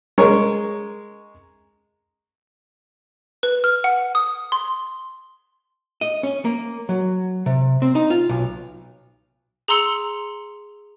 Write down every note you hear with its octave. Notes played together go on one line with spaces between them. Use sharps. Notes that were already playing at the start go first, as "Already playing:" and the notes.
G#3 A#4 C#5
B4
F6
F#5
D#6
C6
D#5
C#4
A#3
F#3
C3
C4
D#4
F4
B1
G#4 A#5 C6 E6 C#7 F7